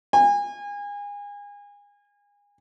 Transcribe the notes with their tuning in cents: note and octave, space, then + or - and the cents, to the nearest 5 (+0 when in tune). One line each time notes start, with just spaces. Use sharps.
G#5 -30